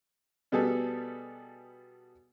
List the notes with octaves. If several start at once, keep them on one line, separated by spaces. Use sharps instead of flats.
B2 G3 B3 G#4 A4